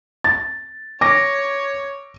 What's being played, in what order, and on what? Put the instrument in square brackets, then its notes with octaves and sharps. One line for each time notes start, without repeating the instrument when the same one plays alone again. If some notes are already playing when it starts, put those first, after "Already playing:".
[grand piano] A6
[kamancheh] C#5 [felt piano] D6 A#6